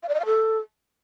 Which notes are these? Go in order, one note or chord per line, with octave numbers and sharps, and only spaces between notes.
F5
D5
D#5
F5
A4